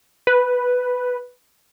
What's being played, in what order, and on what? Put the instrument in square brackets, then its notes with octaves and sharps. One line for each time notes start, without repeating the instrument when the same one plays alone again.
[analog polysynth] B4